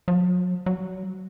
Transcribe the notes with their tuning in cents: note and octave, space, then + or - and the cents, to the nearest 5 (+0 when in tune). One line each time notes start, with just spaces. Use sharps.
F#3 -40
F#3 +25